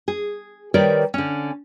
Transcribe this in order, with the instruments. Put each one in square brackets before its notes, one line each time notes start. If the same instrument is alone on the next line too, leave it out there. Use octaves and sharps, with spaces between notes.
[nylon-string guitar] G#4
D#3 G3 A#4 B4 C#5 D5
D3 C#4